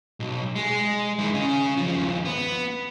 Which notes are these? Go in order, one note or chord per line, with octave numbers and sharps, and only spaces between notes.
B1
G#3
D#3 E4
C#3 C#4
D#2 F3
B3